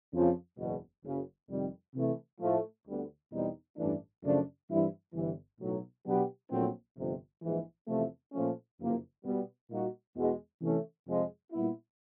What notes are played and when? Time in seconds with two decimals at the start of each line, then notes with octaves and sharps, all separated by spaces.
0.13 F2 C#3 F3
0.58 F#1 E2 B2
1.03 F#1 F#2 C#3
1.50 F2 C3 D#3 G3
1.95 C3 E3 A3
2.40 A2 F3 A3
2.86 D2 D3 G3 B3
3.32 E2 B2 G3 C4 D#4
3.77 A1 G2 E3 A3 D4
4.23 F#2 C#3 F3 A3 D4
4.68 G2 E3 G3 C4 E4
5.13 G1 G2 E3
5.60 B1 A2 F#3
6.05 B2 F#3 B3 D4 G4
6.51 A#1 A#2 F#3 A3 C4
6.97 G1 F2 C3
7.42 A#1 G#2 E3
7.87 E2 C3 F3 A3
8.32 A#2 F3 A3 C#4
8.79 F#1 F2 C3 F3 A#3
9.24 B2 G3 B3
9.70 A#2 G3 A#3 D#4 F#4
10.15 E2 B2 G#3
10.61 C3 E3 A3 C#4
11.07 F2 C3 F3 G#3
11.52 A#2 G3 B3 E4